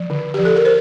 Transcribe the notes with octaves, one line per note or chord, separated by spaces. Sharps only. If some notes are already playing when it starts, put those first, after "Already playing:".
Already playing: F3
D3
F3 G4
A4
A#4
C5